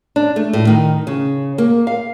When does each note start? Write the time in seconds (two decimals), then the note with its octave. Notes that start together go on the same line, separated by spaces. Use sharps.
0.16 D4
0.36 A3
0.53 A2
0.67 D#3
1.07 C#3
1.58 A#3
1.87 F5